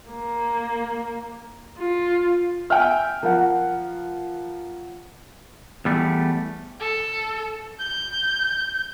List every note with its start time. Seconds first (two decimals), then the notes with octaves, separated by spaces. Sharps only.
0.11 A#3
1.78 F4
2.70 E5 G5 G#5 F6
3.23 F3 A#4 F#5
5.85 E2 G3 A3
6.80 A4
7.79 G6